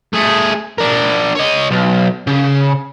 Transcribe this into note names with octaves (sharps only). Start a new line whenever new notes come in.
A3 G#4
D4 A#4
C#5 D#5
B1
C#3